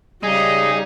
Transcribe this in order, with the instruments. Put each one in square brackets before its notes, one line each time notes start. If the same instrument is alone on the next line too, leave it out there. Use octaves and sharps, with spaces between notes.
[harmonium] C#3 [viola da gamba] G3 [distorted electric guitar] D#4 [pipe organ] G#4